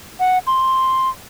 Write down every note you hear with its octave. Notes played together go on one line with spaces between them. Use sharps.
F#5
C6